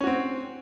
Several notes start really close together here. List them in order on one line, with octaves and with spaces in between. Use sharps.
C#4 F#4 C4